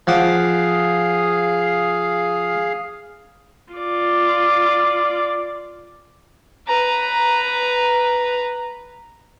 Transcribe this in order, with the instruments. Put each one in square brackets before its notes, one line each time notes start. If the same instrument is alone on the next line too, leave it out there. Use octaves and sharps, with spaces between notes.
[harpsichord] F3 F#5 D6 [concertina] G#4 F5
[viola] F4 D5
[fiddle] B4 A#5